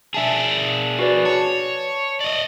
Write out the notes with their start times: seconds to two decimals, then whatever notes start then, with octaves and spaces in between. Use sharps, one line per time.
0.14 D4 G#4 E5 A5
0.99 F#4 B4 D5
1.25 C#5 A5
2.21 D5 D#5